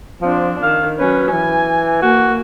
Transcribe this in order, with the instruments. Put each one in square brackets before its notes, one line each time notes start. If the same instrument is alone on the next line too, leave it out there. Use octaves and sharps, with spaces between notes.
[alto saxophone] F3 [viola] C4 D4
[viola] D#3 [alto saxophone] F5
[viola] F#3 C#4 [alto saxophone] B4
[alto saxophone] E3 [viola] G#5
[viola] A#3 [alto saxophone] F#4